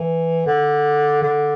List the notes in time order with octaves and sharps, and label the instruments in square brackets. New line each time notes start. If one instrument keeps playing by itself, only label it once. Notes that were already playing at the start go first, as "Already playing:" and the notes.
Already playing: [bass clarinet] E3
D3
D3